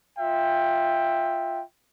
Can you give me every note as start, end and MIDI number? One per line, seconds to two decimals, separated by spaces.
0.19 1.63 65
0.19 1.63 76
0.19 1.63 79